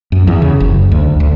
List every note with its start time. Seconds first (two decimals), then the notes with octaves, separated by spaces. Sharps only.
0.12 F#2
0.27 E2
0.42 C#3
0.60 F#1
0.92 D2
1.20 D2